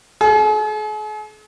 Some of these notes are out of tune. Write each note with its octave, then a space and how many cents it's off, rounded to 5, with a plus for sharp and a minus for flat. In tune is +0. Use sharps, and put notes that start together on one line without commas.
G#4 +45